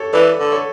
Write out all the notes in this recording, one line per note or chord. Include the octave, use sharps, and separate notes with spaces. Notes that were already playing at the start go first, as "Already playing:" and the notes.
Already playing: G4 A4 C#5
E3 B4 D5
D3
A4 C#5